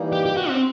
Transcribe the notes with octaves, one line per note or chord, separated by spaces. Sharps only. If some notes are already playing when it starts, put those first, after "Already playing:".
Already playing: E3 G3 A#3 D#4
G4
G4
F#4
C4